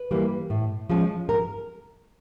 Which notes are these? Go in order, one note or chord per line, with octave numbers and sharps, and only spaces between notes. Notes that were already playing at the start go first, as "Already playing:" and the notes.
Already playing: B4
E3 G3 A#3
A2
F3 G#3 C#4
A#4